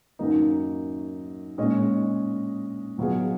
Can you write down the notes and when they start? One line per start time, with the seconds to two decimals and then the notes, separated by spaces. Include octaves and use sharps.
0.19 F#2 D#3 F#3 A#3 D#4
1.58 A#2 G#3 C#4 G#4 D#5
2.98 B2 F#3 B3 F4 G#4